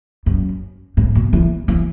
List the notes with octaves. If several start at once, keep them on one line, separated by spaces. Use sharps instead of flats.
F#2
G#2
B2
E3
E3